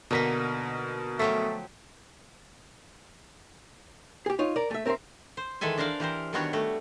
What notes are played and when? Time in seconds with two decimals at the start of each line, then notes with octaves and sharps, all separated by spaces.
0.11 B2 D3 A#3 D#4 A#4 B6
1.19 F3 F#3 A3 G4
4.26 G4 G#4
4.39 D#4 F4 C#5
4.56 A#4 D5
4.71 A3 E5
4.86 C4 A#4 C5 E5 C6
5.37 C5
5.61 D#3 E3 G#3 A4 E5 G#5
5.78 D4 A#4 C5 D5 F5
6.00 E3 G4 A#4 C5
6.33 D#3 G3 B3 D4 F#4 C#5
6.53 G3 A3 F#4